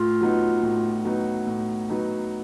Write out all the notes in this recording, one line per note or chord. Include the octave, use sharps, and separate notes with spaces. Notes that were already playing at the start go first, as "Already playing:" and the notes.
Already playing: A2 F4
F#3 B3 D#4
A2
F#3 B3 D#4
A2
F#3 B3 D#4